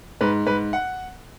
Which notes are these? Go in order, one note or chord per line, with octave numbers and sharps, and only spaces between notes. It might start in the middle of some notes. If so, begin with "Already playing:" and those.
G#2 B4
G#2 B4
F#5